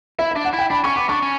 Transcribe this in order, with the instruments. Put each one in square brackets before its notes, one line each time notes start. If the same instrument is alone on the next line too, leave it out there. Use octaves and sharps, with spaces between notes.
[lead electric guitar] E4 [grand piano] E5
[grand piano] E5
[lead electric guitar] D4
[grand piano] F#5
[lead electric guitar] E4
[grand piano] G5
[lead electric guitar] D4 [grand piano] B5
[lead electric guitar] C#4 [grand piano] C#6
[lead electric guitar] B3 [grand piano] D6
[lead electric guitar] D4 [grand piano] C#6
[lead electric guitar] C#4